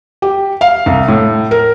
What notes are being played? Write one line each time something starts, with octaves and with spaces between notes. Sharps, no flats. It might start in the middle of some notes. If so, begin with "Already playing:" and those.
G4
F5
C2
A2
A#4